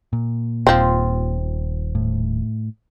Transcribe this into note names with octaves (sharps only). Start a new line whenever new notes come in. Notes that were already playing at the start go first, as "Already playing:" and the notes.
A#2
D#1 F3 C4
A2